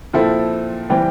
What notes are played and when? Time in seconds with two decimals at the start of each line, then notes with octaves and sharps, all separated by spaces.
0.13 A#2 F3 C4 E4 A4
0.90 E3 G3 C4 G4